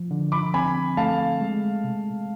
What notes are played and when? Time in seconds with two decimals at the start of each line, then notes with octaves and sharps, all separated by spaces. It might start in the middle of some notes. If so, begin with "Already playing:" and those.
Already playing: F3
0.11 D3
0.32 B5 D6
0.54 C4 G#5 B5
0.97 A3 F5 A5
1.41 G#3
1.84 C3